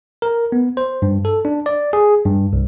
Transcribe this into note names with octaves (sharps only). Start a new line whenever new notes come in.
A#4
B3
C5
G2
A4
D4
D5
G#4
G2
C2